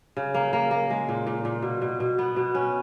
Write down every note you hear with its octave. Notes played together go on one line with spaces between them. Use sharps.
C#3
A#3
A#3
A#3
G#3
A#2
A#2
A#2
B2
B2
B2
B3
B2
C#4